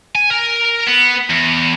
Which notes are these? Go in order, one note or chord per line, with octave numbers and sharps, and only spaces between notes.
G#5
A#4
B3
E2